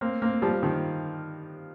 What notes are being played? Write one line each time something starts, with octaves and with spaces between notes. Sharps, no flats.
A#3 C4
A#3 C4
F3 G3
D#3 F3